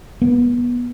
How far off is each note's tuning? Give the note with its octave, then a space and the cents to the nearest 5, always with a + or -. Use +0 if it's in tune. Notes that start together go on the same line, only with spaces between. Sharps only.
B3 -25